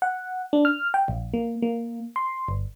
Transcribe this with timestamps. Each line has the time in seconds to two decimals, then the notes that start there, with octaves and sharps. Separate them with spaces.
0.02 F#5
0.53 D4
0.65 F6
0.94 G5
1.08 A#1
1.34 A#3
1.62 A#3
2.16 C6
2.48 G1